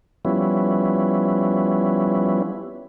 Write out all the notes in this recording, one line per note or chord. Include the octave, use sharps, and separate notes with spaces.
F3 G3 B3 C#4 E4